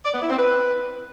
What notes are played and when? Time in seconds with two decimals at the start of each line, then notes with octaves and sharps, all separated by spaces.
0.05 D5
0.13 B3
0.22 E4
0.30 C4
0.38 B4